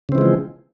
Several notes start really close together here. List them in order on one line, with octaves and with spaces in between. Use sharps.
C#3 C4 E3 G#3 F3